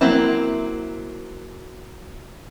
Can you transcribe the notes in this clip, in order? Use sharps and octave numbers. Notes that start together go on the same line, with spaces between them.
F#3 A#3 C4 E4